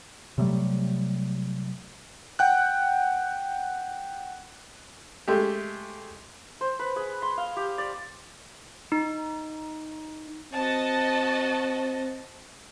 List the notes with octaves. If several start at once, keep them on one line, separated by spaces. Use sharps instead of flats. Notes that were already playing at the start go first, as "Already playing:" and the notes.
C3 F#3 G3 A3
F#5 G5 F#6
G#3 A3 G4
C5
B4
G#4
C6
F5
G4
D5
D#4
C4 F#4 D#5 A5